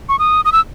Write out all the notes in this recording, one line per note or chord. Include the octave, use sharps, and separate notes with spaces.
C#6
D#6
D#6
E6